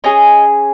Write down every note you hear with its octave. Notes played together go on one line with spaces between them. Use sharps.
C#4 G#4 D#5